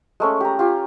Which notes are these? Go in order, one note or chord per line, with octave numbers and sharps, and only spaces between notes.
G#3 A3 C#4
G4 A#5
F4 G4 G#5